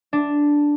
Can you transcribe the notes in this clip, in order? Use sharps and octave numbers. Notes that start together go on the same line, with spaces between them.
D4